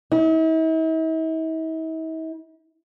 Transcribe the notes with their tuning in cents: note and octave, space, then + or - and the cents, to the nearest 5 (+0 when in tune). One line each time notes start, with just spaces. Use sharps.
E4 -45